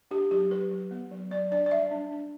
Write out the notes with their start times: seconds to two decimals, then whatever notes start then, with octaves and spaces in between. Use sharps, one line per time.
0.11 D4 G4
0.31 F#3 G4
0.51 F#3 B4
0.71 F#3
0.91 B3
1.11 F#3
1.31 F#3 D5
1.51 D4 D5
1.66 D5
1.71 G3 E5
1.91 D4
2.11 D4